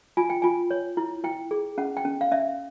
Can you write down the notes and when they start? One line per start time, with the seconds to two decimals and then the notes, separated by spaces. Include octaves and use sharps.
0.17 F4 G#5
0.30 G5
0.42 F4 G#5
0.71 C#5
0.97 E4
1.24 E4 G5
1.51 G#4
1.78 C#4 F#5
1.97 G5
2.05 C#4
2.21 F5
2.31 C#4 E5